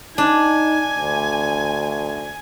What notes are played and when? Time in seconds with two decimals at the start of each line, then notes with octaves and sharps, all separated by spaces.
0.18 D4 D#4 G#5
0.95 D2